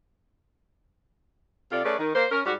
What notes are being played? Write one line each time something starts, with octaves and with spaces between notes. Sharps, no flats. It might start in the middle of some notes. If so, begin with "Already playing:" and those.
C3 F4 A4 D5
A3 C#4 G#4 B4 D5
D#3
A#3 C5
C#4 A#4
G#2 G3 F#4